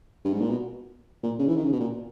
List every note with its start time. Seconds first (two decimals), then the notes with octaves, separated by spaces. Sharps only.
0.25 G2
0.33 G#2
0.41 A#2
0.49 B2
1.23 A#2
1.39 C#3
1.47 E3
1.56 D#3
1.64 C#3
1.73 B2
1.80 A#2